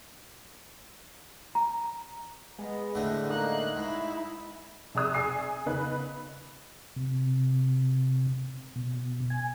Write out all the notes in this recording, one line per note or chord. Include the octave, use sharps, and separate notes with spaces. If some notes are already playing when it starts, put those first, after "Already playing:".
A#5
G#3 B3 D#5
A2 D3 F#5
A#3 D#4 F#6
G#2 E4
C3 G#4 D5 D#6 E6
G#4 D5 G#5 D#6 C7
C#3 B3 D#4 B4
C3
B2
G#5